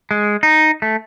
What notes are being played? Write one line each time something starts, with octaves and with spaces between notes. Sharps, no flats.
G#3
D#4
A3